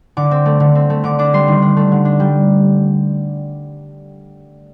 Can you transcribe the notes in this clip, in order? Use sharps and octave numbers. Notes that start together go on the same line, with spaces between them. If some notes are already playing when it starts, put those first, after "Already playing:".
D3 D6
C4
A3
D3
C4
A3
D3 D6
D4 D6
G3 C6
D#3
D4
A3
D3
D4
G3